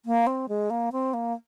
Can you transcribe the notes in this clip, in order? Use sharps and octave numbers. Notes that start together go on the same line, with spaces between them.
A#3
C4
G#3
A#3
C4
A#3